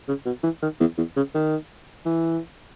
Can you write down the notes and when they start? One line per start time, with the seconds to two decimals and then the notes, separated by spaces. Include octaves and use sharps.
0.09 C#3
0.26 B2
0.44 E3
0.63 D#3
0.80 E2
0.98 E2
1.17 C#3
1.35 D#3
2.06 E3